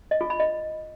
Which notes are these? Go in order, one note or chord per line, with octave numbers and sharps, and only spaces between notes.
D#5
F4
B5
D#5